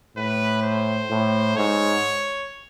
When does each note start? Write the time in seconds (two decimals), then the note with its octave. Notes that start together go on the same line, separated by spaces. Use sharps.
0.17 A2 B4
0.63 C5
1.10 A2
1.56 G#2 C#5